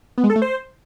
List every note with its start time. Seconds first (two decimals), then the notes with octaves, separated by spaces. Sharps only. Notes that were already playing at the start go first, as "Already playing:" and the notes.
0.18 B3
0.24 G#3
0.30 A4
0.36 A3
0.42 C5